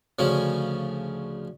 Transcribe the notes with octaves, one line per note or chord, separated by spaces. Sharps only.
D2 C#3 F3 C#4